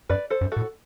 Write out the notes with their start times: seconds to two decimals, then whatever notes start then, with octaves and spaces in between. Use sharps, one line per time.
0.09 F#2 B4 D5
0.30 A4 C5
0.41 F#2
0.52 A2 F#4 A4